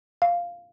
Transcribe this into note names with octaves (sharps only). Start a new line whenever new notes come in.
F5